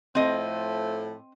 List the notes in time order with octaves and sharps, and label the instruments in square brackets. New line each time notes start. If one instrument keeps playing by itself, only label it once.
[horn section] A2 F3 A3 [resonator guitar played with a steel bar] C4 D#5